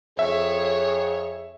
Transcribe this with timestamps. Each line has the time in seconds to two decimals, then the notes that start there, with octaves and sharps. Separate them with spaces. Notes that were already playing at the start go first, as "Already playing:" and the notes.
0.19 F2 G#4 C#5 E5